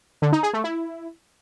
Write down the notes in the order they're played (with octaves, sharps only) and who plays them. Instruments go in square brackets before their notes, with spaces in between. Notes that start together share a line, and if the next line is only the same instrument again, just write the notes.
[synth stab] D3
D#4
G#4
A3
E4